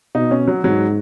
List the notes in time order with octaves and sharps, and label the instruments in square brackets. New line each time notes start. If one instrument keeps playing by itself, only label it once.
[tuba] B2 [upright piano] D#4
[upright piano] C#4
F#3
[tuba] G#2 [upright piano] F#3